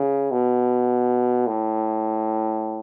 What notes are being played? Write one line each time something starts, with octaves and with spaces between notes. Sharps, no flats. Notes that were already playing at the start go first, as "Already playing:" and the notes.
Already playing: C#3
B2
A2